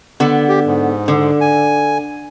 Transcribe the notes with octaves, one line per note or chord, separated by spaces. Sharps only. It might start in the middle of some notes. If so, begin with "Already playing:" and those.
D3 B3
G4
G#2
D3
G#5